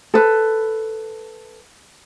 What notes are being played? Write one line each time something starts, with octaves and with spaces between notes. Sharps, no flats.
A4 B4